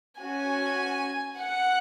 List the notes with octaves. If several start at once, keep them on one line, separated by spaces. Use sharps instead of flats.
C#4 F#4 G#5
F#5